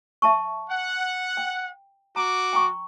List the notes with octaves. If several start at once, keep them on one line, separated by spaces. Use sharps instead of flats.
E5 A5 C#6
F#5
G5
F#4 A#5 D6
G5 A#5 C#6